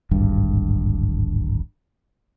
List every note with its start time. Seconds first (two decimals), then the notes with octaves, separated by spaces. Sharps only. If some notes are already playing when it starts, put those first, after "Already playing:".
0.11 D1 G#1 G2